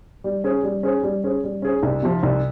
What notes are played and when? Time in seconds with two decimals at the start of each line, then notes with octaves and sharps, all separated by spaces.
0.24 G3
0.44 C#4 G#4 C5
0.63 G3
0.83 C#4 G#4 C5
1.03 G3
1.24 C#4 G#4 C5
1.44 G3
1.62 C#4 G#4 C5
1.83 C2
2.02 C3 F3
2.23 C2